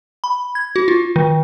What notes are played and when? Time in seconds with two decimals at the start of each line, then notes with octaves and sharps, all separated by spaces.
0.24 B5
0.55 G#6
0.76 F#4
0.88 F4
1.16 D#3